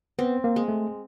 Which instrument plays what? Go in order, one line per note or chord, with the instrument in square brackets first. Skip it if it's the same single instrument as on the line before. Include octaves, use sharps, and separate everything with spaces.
[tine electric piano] B3 [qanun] C4
[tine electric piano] A#3
[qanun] G#3
[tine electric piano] A3